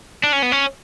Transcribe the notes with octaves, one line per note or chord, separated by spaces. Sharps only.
D4
C#4
B3
C#4